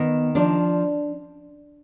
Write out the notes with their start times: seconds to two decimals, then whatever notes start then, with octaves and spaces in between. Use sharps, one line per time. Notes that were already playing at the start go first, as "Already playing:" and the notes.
Already playing: D#3 B3
0.35 F3 D4